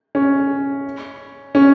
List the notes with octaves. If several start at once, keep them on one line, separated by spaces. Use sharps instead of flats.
C#4
C#4